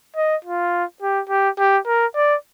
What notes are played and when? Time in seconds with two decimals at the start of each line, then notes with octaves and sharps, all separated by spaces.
0.16 D#5
0.45 F4
1.02 G4
1.29 G4
1.59 G4
1.86 A#4
2.16 D5